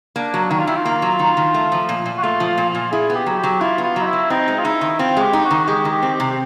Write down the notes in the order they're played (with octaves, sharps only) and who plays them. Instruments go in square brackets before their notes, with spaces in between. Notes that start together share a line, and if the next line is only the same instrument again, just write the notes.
[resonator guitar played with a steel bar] A#3 [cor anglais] D4
[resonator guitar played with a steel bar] F#3
[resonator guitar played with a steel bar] D#3 [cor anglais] F#4
[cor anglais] F4
[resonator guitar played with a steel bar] D#3 [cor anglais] E4
[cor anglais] F4
[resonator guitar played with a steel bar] A#3
F#3
D#3
D#3
A3
F3
A#2
A#2
[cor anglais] F#4
[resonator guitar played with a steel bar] A3 [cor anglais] F4
[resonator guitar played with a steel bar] F3
[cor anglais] F4
[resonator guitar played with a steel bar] A#2
[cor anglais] F4
[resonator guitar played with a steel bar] A#2
[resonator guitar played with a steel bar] E4 [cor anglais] G#4
[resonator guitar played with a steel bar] B3
[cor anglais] G4
[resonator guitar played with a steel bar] F#3
[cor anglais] G4
[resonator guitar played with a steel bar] F#3
[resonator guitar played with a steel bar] E4 [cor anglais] F4
[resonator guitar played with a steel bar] B3
[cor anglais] F4
[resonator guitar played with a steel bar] F#3
[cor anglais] D#4
E4
[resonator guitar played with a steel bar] F#3
[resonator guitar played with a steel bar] C4 [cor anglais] D#4
[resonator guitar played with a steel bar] G#3
[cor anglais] F4
[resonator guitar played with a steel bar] D#4 [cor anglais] E4
[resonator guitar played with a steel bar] D#3
[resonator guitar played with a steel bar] C4 [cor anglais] F4
[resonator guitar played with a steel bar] G#3
[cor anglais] G4
[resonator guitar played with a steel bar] D#4
[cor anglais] F#4
[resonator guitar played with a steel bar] D#3
[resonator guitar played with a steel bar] G#3 [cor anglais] G4
[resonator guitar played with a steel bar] D#3
[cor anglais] G4
[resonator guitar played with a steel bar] C4
[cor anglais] G4
[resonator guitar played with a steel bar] C3
[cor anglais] G4